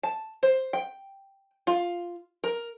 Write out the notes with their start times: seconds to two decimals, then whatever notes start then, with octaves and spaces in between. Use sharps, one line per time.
0.03 A5
0.43 C5
0.73 G5
1.67 F4
2.44 A#4